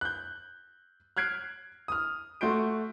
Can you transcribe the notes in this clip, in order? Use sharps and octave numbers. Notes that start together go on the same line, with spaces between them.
F#6 G6
F6 F#6 G#6 C7 D7
D#6 F6
A3 F#4 C6 G6 D7